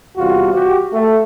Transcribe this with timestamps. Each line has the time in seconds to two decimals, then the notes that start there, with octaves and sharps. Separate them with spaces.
0.17 E2 C3 G3 F4 F#4
0.53 F#4 G4
0.93 A3